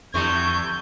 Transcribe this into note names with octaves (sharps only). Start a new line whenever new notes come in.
F2 D3 E3 G3 C#6 G6